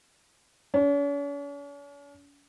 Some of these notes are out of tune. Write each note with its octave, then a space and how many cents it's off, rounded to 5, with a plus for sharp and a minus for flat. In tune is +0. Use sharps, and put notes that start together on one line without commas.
C#4 +45